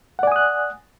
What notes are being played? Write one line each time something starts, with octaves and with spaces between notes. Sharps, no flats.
D5 F#5 G#5 D#6 F#6